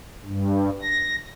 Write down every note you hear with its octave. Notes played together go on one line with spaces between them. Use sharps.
G2
A#6